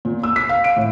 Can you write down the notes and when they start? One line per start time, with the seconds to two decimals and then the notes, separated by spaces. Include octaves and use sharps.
0.05 A#2
0.23 E6
0.36 B6
0.49 F5
0.64 D7
0.76 A2